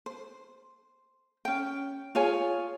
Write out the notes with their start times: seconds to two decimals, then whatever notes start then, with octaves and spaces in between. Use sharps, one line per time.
0.06 C5
1.45 C#4 G5
2.15 F4 G#4 C#5 G#5